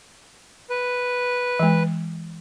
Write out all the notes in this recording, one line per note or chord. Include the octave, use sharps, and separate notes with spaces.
B4
E3 G#3